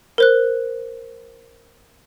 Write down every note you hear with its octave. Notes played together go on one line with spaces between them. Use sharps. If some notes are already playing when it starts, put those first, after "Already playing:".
A#4 C5 F#6